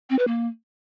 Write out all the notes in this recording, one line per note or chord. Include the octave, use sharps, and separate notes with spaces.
C4
B4
A#3